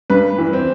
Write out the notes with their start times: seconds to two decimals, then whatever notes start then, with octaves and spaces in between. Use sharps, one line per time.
0.10 G2 B4
0.38 E3
0.53 C4